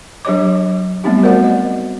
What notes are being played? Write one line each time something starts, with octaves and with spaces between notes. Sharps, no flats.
F#3 D4 G4 C#5 D#5 D6
G3 A3 B3 C4 D#4 G4
A3 F#4 A#4 C5 D5 F#5
D#5